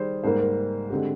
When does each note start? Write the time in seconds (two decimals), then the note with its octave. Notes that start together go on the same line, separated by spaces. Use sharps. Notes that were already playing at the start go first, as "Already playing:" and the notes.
Already playing: D#3 G3 G#4 C5
0.24 G#2 G3 A#3 C5
0.41 A#4
0.90 D3 G#3 C4 G4